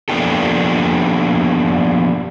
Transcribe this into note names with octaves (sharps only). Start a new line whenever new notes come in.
F3 A#3 B3 D4 G4 A4